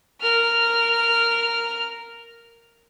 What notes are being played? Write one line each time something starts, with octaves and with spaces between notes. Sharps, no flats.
A#4 F6